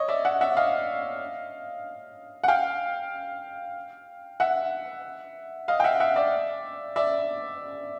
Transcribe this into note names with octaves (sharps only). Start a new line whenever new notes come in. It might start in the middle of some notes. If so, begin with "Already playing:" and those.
Already playing: C#5 D#5
D5 E5
E5 F#5
E5 F#5
D#5 F5
F#5
F5 G5
E5 F#5
D#5 F5
G5
E5 F#5
E5 F#5
D5 E5
D5 E5